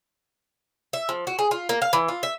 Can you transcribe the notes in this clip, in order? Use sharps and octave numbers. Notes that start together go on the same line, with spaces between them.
E5
F3
F#4
G#4
F4
A#3
F5
E3
F4
E5